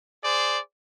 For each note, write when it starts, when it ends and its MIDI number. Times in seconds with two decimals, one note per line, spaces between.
0.24 0.60 68
0.24 0.60 72
0.24 0.60 74